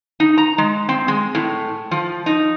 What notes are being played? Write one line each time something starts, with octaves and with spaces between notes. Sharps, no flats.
D#4
A#5
G#3
C4
G#3
A2
F3
D#4